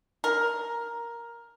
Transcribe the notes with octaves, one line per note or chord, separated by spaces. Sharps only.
A#4